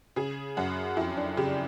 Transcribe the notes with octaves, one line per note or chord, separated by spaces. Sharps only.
C#3 G#4
F#2 F#4
F2 E4
D4
C#3 G4